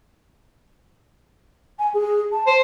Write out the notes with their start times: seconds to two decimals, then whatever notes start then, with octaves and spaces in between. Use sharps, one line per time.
1.79 G#5
1.94 G#4
2.32 A5
2.47 C5